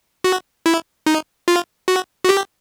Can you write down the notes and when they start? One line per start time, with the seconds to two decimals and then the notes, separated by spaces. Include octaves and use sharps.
0.24 F#4
0.66 E4
1.06 D#4
1.48 F4
1.88 F#4
2.24 F#4
2.29 G4